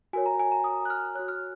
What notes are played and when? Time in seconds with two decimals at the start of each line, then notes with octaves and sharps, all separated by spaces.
0.13 F#4 A#4 C#5 G#5
0.26 A#5
0.39 G#5
0.52 A#5
0.64 D#6
0.85 F#6
0.90 F6
1.15 F#4 C#5 F#6
1.28 F6